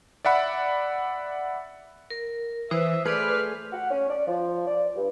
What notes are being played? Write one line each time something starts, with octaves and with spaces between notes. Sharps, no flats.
D5 E5 F#5 B5
A#4
E3 C5 E5 D#6
A3 G#4 B4 C5 D5 D6 F6
F#5
C#4
D5
F3
D5
G2